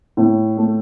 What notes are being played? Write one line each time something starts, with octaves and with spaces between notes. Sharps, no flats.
A2
A3